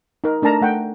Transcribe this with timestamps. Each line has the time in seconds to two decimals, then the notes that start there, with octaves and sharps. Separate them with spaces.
0.24 D#4 A#4
0.42 A3 D4 A#4 A5 A#5
0.61 A3 F#5 G5